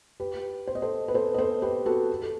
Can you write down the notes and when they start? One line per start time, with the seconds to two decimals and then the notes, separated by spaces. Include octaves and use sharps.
0.20 G4 B4
0.67 C5
0.75 D#5
0.82 A4 C5
1.08 B4
1.14 A4 C5
1.34 D#5
1.38 A4 C5
1.62 G4 B4
1.86 F#4 A4
2.22 A4